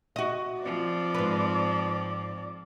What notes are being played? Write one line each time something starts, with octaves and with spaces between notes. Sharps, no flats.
F#4 D#5
F3 C4 D5
G#2 B4